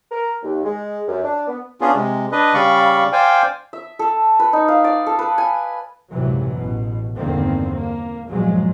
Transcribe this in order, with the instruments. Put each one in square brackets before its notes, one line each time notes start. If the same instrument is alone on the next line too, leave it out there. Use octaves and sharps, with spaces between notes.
[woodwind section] A#4
D#2
G#3
F#2
D4
B3
[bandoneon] B3 C#4 D4 F4 G#4
C3 G#3
D4 B4 D#5
C#3 G3 D5 F5 B5 C#6
C5 D5 F5 G5 G#5
[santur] E5
A4
B4
D#4
F5
D5
A4
B4
G#5
[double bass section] C#2 F#2 A2 C3 E3 F#3
A1 B2
E2 G2 D3 D#3 A#3 C4
A#3
B1 G2 A#2 F3 F#3 G#3